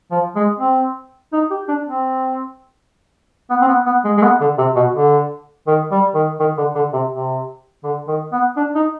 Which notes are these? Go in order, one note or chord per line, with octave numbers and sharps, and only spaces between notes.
F3
G#3
C4
D#4
G4
D4
C4
B3
C4
B3
B3
G#3
G#3
B3
D3
C3
B2
D3
D#3
G3
D#3
D#3
D3
D3
C3
C3
D3
D#3
B3
D4
D#4